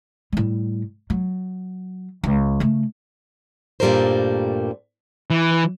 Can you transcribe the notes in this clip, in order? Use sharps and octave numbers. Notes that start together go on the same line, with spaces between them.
A2 G3
F#3
C#2
C#3 A3
G2 A#2 G3 A3 A#4 C5
E3